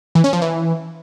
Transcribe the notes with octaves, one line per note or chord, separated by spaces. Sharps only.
E3
C#4
F3
E3